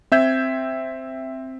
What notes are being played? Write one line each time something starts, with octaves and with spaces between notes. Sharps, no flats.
C4 E5 G6 G#6